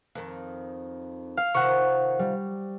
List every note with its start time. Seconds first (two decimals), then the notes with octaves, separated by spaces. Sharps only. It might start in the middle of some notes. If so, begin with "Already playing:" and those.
0.15 F2 D#3
1.37 F5
1.54 C3 D#3 F3 F#5 C#6
2.19 G3